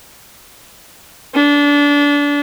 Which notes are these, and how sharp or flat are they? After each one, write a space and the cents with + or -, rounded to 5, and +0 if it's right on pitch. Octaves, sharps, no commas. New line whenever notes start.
D4 -25